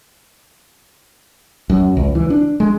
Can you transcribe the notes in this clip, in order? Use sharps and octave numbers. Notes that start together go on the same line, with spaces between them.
F#2
C#2
E3
D4
G#3